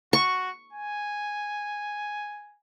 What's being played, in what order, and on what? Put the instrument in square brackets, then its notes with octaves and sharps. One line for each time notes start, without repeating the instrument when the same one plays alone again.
[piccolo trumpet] F#4 [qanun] C#6
[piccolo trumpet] G#5